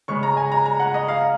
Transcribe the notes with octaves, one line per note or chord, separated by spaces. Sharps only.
C#3 G#3 C#6
A#5
G#5
A#5
A#5
F#5
D#5
F5